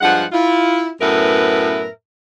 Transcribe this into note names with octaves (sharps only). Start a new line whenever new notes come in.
G2 F3 G#3 F#5
E4 F4
F#2 A2 B3 A#4 B4 E5